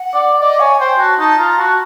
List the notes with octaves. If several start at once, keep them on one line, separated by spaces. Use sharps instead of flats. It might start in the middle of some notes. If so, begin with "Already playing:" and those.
Already playing: F#5
D5
D5 D#5
C#5 G#5
C5 G5
F#4 A5
D#4 A5
F4 A#5
F#4 A5